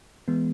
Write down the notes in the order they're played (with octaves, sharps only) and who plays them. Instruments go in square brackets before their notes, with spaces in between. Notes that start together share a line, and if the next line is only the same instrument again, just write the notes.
[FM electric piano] E3 G#3 B3